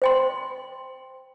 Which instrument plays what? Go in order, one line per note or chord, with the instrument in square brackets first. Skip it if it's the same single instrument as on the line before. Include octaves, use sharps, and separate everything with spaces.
[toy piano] C5 G5 C6